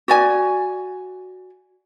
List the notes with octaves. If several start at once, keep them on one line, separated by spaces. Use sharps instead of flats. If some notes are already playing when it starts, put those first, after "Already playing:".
F#4 D5 G#5